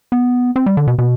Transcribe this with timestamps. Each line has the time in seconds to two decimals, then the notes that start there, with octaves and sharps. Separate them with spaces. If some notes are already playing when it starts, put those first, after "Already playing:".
0.12 B3
0.56 C4
0.66 G3
0.77 D3
0.87 B2
0.98 B2